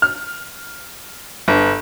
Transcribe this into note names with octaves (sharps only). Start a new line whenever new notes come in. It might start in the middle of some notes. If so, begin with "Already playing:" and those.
F6
G1